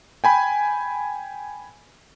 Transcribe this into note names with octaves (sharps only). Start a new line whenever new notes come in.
G5 G#5 B5